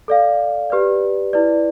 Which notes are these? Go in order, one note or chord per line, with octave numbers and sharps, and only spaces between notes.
A4 D5 F5
G4 B4 D5
E4 B4 D5